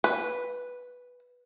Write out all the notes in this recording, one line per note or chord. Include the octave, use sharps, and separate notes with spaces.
B4